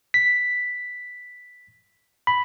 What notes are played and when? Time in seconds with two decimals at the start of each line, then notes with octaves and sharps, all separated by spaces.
0.14 B6
2.27 B5